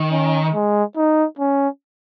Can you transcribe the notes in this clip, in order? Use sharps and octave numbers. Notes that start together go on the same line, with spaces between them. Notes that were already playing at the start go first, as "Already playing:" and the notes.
Already playing: D#3
C#4
G#3
D#4
C#4